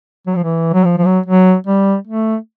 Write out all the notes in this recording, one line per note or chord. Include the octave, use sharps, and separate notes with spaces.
F#3
F3
E3
F#3
F3
F3
F#3
F#3
G3
A3